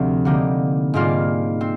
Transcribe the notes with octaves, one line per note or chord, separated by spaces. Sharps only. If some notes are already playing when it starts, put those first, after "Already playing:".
Already playing: D2 C3 F3 C4
D3 G3 A#3 D#4
G#2 G3 A#3 F4
C4